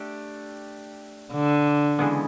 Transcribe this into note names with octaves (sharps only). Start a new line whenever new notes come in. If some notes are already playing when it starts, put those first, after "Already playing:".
Already playing: A3 D4 G4
D3
C#3 E3 G#3 B3